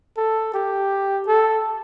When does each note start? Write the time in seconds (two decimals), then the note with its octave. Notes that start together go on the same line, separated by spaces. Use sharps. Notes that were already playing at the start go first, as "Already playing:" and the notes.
0.17 A4
0.54 G4
1.27 A4